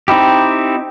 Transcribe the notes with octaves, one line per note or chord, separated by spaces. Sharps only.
C4 D#4 E4 G4